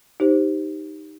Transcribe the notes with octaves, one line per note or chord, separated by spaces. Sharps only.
D#4 G4 C5